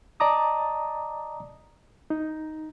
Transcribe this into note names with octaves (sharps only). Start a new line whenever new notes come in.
D5 D#5 A5 A#5 D6 D#6
D#4